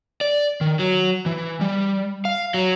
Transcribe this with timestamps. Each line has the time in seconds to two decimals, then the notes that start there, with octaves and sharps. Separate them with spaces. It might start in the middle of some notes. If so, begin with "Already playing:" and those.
0.21 D5
0.61 D#3
0.79 F#3
1.26 E3
1.61 G3
2.25 F5
2.54 F#3